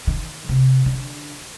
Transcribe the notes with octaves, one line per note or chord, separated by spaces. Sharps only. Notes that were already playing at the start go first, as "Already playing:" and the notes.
D#3
C3
D3